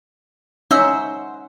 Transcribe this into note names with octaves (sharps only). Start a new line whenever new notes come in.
C#4 D#4 C5 E5 F#5 E6